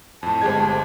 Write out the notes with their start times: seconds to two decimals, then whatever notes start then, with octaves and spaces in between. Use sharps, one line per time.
0.23 F2 A2 A5
0.41 G1 G#3 G4 C5 G#6